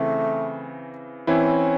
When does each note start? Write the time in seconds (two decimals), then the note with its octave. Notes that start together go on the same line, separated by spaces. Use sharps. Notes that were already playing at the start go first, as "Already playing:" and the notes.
Already playing: C#3 E3 A3 C4
1.27 E3 C4 C#4 E4